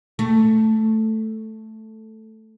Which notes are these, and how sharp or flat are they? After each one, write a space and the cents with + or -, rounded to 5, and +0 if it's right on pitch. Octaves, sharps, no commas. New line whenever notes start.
A3 +0